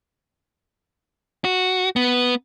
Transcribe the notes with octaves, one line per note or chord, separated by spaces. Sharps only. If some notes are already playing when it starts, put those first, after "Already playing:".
F#4
B3